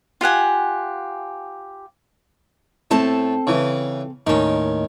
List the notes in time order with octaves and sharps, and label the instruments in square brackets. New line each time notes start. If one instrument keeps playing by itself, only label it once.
[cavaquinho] F4 G4 F#5 G#5
[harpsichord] A2 [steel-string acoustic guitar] C4 A4 A5
[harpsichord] C#3 E3
[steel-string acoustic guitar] D#2 A2 [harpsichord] D#3 C#4